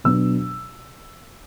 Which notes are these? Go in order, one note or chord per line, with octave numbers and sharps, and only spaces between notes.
B2 F#3 B3 D4 E6